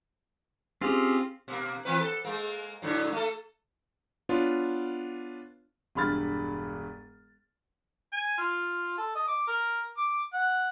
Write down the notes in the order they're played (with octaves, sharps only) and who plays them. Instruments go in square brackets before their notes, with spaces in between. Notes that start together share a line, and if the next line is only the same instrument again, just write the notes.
[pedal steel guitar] C4 F4 [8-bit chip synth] C#4 G4 G#4
[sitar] B2 A#3
E3 C4 B4
A4
G#3 A#3
G#2 D3 F#3
A3 A4
[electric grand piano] B3 D4 F4 C#5
[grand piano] E1 G2 B5 F6 A6
[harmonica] G#5
F4
A4
D#5
D6
A#4
D6
F#5